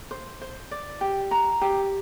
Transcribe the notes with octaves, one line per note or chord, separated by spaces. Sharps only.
C5
C5
D5
G4
A#5
G4